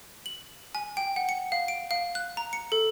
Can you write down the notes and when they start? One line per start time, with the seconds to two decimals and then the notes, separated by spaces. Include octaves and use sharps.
0.26 F#7
0.75 G#5
0.97 G5
1.16 F#5
1.29 C#7
1.52 F5
1.68 D7
1.91 F5
2.15 F#6
2.37 A#5
2.53 C#7
2.72 A4